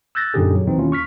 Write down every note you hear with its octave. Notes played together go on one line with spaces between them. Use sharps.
E6 F#6 G6 A6 A#6
F#2 A#2 D3 D#4 G4 G#4
F#3
D#2 B2 E3 C4 D#4
D#2 C#4 E4 F4
C#6 F6 B6